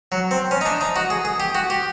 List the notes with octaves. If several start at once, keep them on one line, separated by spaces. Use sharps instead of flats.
F#3
C4
C#4
D#4
D4
D#4
F#4
G#4
G#4
G4
F#4
G4